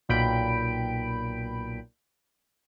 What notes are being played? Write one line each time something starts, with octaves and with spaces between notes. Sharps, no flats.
B1 A#2 G5 B5 D7